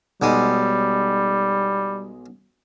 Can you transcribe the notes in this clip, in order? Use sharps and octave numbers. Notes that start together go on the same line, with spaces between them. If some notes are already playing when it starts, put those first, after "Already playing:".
B1 G3 G#3 D#6